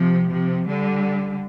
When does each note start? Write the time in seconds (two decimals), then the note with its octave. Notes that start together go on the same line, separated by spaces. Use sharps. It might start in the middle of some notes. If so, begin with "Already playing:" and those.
Already playing: C3 F3
0.30 C3 F3
0.68 D3 G3